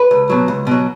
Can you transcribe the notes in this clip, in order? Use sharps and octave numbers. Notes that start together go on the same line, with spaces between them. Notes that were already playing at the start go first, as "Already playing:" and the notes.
Already playing: B4
C#2
B2 F#3
C#2
B2 F#3